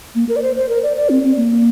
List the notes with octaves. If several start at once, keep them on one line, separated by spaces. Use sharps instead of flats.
A#3
A#4
D5
C5
C5
A#4
D5
D5
C4
C4
A#3